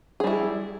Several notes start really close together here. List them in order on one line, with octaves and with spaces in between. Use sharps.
G#4 G3 E4